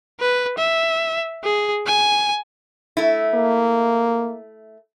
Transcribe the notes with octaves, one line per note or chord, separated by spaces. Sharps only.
B4
E5
G#4
G#5
A3 E4
A#3